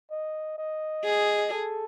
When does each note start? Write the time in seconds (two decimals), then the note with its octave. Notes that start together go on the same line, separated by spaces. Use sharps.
0.11 D#5
0.58 D#5
1.05 G#4
1.52 A4